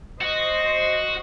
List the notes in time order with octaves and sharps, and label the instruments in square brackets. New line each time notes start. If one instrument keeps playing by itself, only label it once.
[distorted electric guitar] F#4 [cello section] C5 D#5